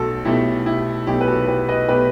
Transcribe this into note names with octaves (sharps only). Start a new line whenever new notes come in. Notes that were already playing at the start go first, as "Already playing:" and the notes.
Already playing: B1 B2 A3 F#4 A4
B1 B2 A3 E4 G4
E4 G4
B1 B2 A3 E4 G4
B4
F#4 A4
G4 B4
B4 D#5
B2 A3 G4 B4